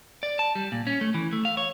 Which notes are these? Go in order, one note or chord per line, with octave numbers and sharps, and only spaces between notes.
D5
A5
G3
A#2
C#4
A3
E3
A3
F5
C#5